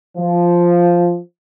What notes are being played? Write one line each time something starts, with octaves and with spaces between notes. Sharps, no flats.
F3